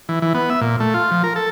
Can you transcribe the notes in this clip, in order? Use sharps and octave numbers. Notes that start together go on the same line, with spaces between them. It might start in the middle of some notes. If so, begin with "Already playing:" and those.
E3
E3
B3
E5
A#2
A3
F4
F3
A#4
A4